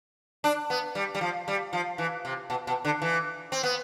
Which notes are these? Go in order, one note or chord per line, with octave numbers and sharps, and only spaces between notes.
D4
B3
G3
G3
F3
G3
F3
E3
C3
B2
B2
D3
E3
C4
B3